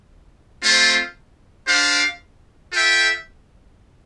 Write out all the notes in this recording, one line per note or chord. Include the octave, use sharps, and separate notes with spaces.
A3 C4 F4 C5
D4 G4 C5 F5
F4 A4 E5 G5